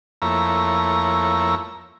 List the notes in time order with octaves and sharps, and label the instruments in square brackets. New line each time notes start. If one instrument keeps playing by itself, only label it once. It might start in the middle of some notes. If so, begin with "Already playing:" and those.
[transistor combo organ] F2 A3 A#3 E4 C#5 A#5